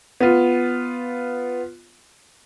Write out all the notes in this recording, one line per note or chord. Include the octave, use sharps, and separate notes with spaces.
B3 F4